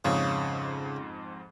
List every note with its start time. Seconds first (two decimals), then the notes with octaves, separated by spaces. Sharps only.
0.05 F2 G#2 C#3